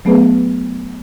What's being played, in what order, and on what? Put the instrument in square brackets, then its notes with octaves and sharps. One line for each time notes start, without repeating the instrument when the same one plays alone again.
[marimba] F#3 A3 B3 G#4 B4